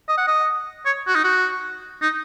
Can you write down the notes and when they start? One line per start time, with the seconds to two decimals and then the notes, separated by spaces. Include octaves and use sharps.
0.08 D#5
0.18 F#5
0.27 D#5
0.85 C#5
1.07 F#4
1.15 D#4
1.24 F#4
2.02 D#4